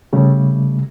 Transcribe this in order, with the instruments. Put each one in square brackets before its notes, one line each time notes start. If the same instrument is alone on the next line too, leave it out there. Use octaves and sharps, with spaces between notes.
[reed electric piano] C#3 G3 A3